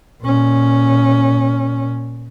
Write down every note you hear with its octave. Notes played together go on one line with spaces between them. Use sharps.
A#2 C#4